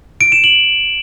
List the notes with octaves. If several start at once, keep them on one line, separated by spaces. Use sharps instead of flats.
D7
E7
F#7